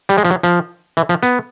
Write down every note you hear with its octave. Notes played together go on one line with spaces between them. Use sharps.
G3
G#3
F3
F#3
F3
E3
F3
B3